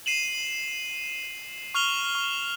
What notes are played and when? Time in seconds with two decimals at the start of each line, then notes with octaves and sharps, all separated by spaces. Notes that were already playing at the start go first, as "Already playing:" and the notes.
0.06 C7 D#7 E7 F#7
1.75 C#6 F6 F7 G7
2.15 C#6